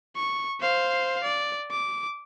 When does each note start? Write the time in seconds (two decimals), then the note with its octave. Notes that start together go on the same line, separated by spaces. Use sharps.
0.16 C#6
0.60 C5 F5
1.24 D5
1.71 D6